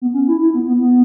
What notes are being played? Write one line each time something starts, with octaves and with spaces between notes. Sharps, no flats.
B3
C#4
E4
E4
B3
B3
B3